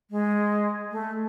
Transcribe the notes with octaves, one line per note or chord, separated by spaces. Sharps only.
G#3
A3